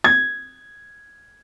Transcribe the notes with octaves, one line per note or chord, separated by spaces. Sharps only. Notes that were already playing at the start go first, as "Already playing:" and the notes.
G#6